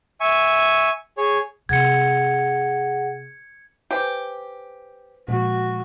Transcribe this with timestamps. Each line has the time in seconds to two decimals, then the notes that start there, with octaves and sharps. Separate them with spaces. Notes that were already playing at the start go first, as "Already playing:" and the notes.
0.20 E5 G#5 C#6
1.18 G#4 C#5
1.69 C3 G#4 F#5 G#6 C#7
3.91 G4 B4 C5 G#5
5.28 A#2 F3 G#3 F#4